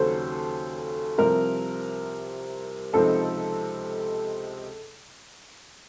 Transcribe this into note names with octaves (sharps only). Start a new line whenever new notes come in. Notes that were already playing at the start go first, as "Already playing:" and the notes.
Already playing: D#2 C#3 F#3 A4 C5
C2 C3 F3 C4 A#4
C#2 C3 F3 C4 D#4 A4